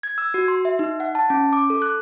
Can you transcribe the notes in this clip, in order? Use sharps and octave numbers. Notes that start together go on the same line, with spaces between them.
G#6
E6
F#4
C6
E5
D#4
F#5
A5
C#4
D6
A4
F#6